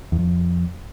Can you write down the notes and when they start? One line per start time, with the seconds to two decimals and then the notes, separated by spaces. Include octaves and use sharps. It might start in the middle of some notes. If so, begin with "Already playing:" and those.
0.12 E2
0.19 F2